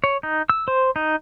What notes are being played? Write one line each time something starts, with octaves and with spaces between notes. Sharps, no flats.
C#5
D#4
E6
C5
D#4